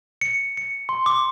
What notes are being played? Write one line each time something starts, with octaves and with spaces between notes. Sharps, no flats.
C#7
C#7
C6
D6